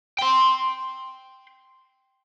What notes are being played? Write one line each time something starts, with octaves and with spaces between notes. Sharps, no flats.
G5 C6